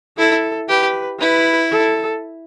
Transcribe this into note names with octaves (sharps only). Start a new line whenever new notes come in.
E4 A4
G4 B4
E4 B4
A4